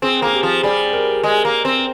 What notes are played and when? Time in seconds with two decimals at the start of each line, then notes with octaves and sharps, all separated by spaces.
0.02 C4 G#4
0.22 A#3 G#4
0.33 G4
0.43 F3
0.63 G3 G#4
0.93 A#4
1.23 G#3
1.45 A#3
1.65 C4